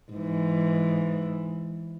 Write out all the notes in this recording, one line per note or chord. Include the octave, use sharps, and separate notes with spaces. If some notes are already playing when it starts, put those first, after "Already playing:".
G#2 E3